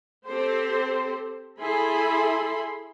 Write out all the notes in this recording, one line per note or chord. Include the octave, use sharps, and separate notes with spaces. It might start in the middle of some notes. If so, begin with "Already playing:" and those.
C4 G4 A4 C5
E4 G#4 A4 B5 C6